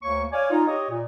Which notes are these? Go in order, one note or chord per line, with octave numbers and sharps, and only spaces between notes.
D2 A#3 C#5 C#6
C#5 D5 F5 G#5
D#4 F4
G4 C#5 D#5
A#2